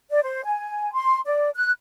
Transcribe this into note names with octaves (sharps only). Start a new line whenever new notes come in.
D5
C5
G#5
C6
D5
F#6